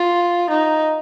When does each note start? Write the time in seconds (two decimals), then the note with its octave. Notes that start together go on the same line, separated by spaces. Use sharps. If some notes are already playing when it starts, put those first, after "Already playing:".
Already playing: F4
0.50 D#4